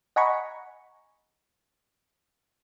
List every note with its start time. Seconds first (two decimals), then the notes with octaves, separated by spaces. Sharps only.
0.16 D#5 F#5 G#5 A#5 B5 C#6